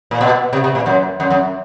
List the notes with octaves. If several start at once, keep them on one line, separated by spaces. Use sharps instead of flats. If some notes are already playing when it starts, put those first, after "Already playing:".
A#2
B2
C3
C3
A#2
F#2
F#2
F#2